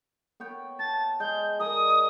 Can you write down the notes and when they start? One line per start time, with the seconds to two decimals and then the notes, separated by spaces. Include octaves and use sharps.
0.40 B3 C#5 G5
0.79 A5 A6
1.20 G#3 G6
1.60 G#3 A#4 D5 D#6